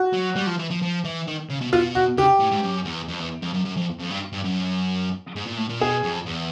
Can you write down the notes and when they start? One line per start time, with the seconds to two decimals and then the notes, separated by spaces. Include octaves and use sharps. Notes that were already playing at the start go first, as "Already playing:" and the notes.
Already playing: F#4
0.13 F#3
0.36 G3
0.47 F3
0.59 E3
0.71 F3
0.82 F3
1.05 E3
1.27 D#3
1.49 C#3
1.61 B2
1.72 B2 F4
1.95 F#4
2.18 C#3 G4
2.40 A2
2.52 G#2
2.63 F#2
2.85 E2
3.08 F2
3.20 E2
3.42 F2
3.54 F#2
3.65 F#2
3.77 F2
3.99 F2
4.10 G2
4.33 G2
4.45 F#2
5.36 G#2
5.46 A#2
5.58 A2
5.70 A#2
5.80 B2 G#4
6.03 F2
6.26 E2